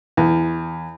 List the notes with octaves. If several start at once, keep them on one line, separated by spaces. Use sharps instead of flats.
E2